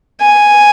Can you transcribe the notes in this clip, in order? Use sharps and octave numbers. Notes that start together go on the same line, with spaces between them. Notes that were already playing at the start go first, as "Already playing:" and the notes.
G#5